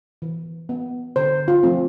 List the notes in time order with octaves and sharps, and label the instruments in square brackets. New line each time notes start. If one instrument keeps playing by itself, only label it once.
[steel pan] E3
B3
D3 C5
F4
F3 A3 C4